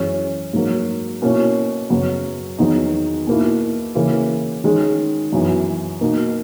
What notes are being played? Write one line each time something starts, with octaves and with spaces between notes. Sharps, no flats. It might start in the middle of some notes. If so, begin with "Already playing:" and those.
Already playing: F#2 E3 G#3 C#4
G#2 F#3 A#3
B2 A#3 C#4 E4
F#2 C#3 F#3 B3
E2 D#3 F#3 B3 D#4
B2 A#3 E4
C#3 E3 A#3
D#3 G#3 C#4
F#2 E3 B3
B2 A#3 D#4